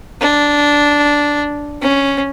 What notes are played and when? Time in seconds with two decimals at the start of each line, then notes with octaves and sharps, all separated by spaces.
0.21 D4
1.81 C#4